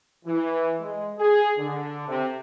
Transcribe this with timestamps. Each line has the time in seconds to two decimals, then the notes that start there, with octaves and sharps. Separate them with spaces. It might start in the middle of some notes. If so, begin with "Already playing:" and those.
0.26 E3
0.80 G#3
1.19 G#4
1.58 D3
2.08 C3